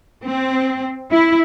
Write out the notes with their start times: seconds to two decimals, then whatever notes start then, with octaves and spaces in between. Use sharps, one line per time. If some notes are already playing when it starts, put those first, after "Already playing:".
0.23 C4
1.11 E4